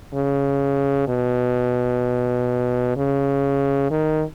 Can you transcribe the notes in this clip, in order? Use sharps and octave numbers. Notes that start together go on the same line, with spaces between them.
C#3
B2
C#3
D#3